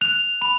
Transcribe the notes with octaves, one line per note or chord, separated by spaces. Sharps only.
F#6 F7
B5 F7